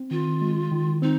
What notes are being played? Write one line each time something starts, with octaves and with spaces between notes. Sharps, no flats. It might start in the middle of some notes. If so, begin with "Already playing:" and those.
Already playing: C4
D#3 F4
G#3
D#3
C4 D#4